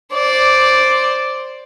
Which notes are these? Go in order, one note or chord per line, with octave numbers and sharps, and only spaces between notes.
C5 D5